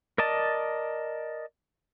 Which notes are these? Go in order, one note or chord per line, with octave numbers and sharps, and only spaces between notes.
A#4 D5 D#5 A5